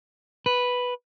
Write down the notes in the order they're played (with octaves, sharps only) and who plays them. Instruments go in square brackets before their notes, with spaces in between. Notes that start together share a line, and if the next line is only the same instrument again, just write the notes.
[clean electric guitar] B4